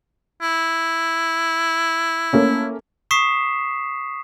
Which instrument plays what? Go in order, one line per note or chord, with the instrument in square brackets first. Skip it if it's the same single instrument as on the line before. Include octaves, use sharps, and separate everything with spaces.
[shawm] E4
[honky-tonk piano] A3 A#3 C#4
[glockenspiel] C#6 D#6 B6 C7 E7